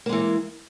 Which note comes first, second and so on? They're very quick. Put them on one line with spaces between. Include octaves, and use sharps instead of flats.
A#3 G#3 E3